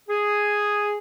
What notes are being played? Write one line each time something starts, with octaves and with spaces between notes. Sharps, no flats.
G#4